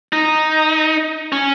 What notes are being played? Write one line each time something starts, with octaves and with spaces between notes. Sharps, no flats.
D#4
C#4